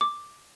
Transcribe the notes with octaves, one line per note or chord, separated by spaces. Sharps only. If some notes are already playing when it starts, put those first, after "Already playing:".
D6